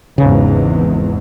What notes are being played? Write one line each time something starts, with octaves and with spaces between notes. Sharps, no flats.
G#1 E2 G#2 C#3